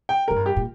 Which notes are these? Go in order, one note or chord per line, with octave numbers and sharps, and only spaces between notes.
G5
A#2 A#4
G2
G4
A#2